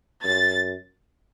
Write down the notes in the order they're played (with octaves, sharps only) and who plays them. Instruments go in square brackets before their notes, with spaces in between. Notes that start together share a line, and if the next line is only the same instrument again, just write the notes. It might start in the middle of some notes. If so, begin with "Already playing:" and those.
[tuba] F#2 [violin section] A6